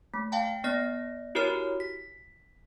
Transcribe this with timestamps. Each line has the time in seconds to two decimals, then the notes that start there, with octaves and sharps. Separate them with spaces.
0.14 A3
0.32 F5 G5 A5
0.64 B3 D5 A#6
1.35 E4 F#4 G4 A#4 C#5 F6
1.80 B6